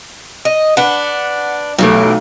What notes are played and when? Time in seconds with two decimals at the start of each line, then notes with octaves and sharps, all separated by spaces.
0.45 D#5
0.77 D4 B4 F#5
1.79 B1 B2 E3 A3 G4